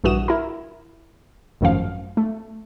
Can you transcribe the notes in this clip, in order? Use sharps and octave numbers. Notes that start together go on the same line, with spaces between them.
A#1 G2 E3 F#4 D#6 E7
E4 A#4
G#1 F#2 A2 F3 F5
A3